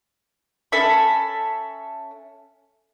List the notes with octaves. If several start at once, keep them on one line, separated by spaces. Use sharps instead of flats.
C#4 A4 E5 B5